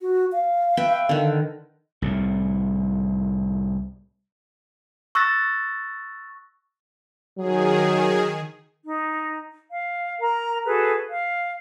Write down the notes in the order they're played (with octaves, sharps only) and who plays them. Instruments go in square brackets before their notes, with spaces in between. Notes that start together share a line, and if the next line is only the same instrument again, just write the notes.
[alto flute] F#4
F5
[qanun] B4 E5 G5
D3 D#3
[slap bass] C2 A2
[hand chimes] C#6 E6 F#6 A6 A#6
[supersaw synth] D#3 G#4 [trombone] F#3
[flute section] D#4
F5
A#4 A#5
F#4 G#4 A4 B4
F5